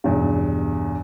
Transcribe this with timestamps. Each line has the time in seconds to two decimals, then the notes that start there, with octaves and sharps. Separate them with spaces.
0.04 B1 E2 G2